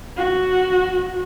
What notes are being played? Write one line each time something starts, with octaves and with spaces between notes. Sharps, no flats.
F#4